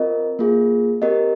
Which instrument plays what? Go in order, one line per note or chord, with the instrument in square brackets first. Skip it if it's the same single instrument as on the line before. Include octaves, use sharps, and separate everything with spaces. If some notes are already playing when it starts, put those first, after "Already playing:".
Already playing: [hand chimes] C4 F4 A#4 D#5
A#3 F4 G#4
C4 G4 A#4 D#5